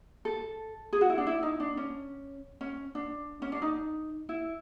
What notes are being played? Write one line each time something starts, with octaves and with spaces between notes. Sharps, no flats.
A4
G#4
F#4
E4
D4
E4
D#4
D4
C#4
C#4
D4
C#4
D4
D#4
E4